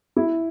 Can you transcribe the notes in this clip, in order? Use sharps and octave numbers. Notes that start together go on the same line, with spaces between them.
E4